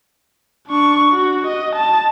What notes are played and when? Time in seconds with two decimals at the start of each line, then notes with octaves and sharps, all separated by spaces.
0.68 D4 C#6
1.13 F#4
1.47 D#5
1.76 A5